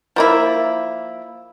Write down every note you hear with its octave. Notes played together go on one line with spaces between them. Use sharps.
F3 A#3 E4